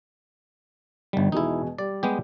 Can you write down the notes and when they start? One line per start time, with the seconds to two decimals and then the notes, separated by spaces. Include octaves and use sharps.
1.13 G1 D#3 G3
1.32 E1 B2 D#4 E4 G#4
1.78 G3 D5
2.03 G#3 B3 G4